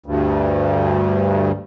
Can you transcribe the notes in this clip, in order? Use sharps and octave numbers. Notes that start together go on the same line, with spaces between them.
D2 G2